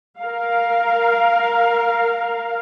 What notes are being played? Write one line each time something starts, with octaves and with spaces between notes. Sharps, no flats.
A#4 F5